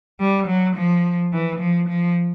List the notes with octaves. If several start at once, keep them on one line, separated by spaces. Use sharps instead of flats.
G3
F#3
F3
E3
F3
F3